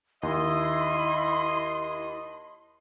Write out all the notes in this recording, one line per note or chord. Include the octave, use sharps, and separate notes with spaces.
D#2 E4 D#5 C6